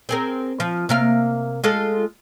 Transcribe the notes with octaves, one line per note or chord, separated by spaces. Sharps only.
C4 G#4 A#4
F3
C3 A#3 F5
G#3 F4 A4